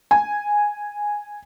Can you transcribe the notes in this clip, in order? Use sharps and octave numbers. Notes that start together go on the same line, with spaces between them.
G#5